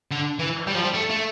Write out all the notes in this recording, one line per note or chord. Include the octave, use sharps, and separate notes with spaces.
D3
E3
G3
F3
G3
A3
A3